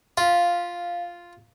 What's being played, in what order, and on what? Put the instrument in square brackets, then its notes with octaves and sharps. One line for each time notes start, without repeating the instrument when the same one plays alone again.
[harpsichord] F4 [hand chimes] F5